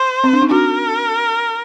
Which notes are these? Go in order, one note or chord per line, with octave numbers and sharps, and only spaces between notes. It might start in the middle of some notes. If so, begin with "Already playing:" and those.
Already playing: C5
C4
D4
D#4
D4 F#4 A#4